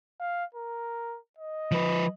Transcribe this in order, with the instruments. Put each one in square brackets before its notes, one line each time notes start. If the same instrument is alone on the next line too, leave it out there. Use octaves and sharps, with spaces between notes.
[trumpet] F5
A#4
D#5
[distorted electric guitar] F3 B4